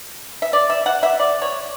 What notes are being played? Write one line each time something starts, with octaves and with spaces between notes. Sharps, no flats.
E5
D5
E5
F#5
E5
D5
C#5